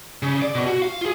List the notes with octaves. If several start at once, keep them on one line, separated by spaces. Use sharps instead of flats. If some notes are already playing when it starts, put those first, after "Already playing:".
C#3
D5
B2
F#4
F5
F4 G#4